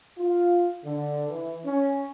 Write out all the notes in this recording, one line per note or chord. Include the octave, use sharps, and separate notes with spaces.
F4
D3
E3
C#4